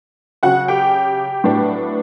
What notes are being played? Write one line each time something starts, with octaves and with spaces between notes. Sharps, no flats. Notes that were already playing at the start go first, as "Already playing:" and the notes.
C#3 F#3 C#4 F#4 F#5
G4 G5
A2 F#3 B3 D4